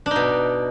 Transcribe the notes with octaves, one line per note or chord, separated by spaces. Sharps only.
B2 D4 D#4